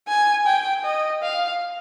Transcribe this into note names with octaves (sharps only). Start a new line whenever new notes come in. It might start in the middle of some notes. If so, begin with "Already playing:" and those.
G#5
G5
D#5
F5